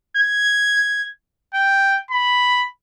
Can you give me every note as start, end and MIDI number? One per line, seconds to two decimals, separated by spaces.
0.17 1.06 92
1.54 1.98 79
2.11 2.66 83